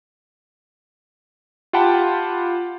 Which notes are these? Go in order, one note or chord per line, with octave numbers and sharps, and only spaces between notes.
F4 G4 F#5 G5 A5 B5